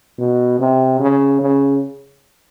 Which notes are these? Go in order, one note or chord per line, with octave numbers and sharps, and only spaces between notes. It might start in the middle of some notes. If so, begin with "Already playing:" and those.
B2
C3
C#3
C#3